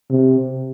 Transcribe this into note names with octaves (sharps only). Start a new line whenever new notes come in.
C3